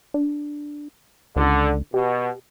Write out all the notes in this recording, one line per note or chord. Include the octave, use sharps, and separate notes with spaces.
D4
C#2 D3
B2 G4